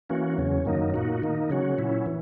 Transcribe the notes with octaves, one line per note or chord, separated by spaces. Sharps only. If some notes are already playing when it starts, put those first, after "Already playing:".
E3 A#3 C#4 F#4
E2 C#3 F#3 C#4
F#2 D#3 F#3 A#3 D#4
A#2 A#3 D#4 F#4
D#3 A#3 D#4
C#3 F#3 C#4 F#4
A#2 F#3 C#4 E4
E3